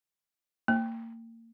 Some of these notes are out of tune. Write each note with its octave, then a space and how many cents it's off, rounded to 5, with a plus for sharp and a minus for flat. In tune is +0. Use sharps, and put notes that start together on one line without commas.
A#3 -30